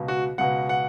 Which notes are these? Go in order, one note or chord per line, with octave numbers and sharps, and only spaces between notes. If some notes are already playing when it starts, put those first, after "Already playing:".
Already playing: C#2 B2
F#4
C#2 B2 F#5
F#5